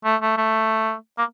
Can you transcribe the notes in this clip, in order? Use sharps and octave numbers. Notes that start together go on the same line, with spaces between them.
A3
A3
A3
A#3